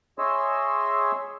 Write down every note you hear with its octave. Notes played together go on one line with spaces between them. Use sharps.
G#4 C#5 D#5 E5 C6 E6